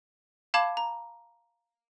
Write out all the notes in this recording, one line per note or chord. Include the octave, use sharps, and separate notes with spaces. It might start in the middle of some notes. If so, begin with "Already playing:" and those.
F5 A5 B5 D6 G#6 E7
A#5